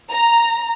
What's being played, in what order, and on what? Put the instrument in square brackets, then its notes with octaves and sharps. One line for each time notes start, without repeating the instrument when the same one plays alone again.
[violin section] A#5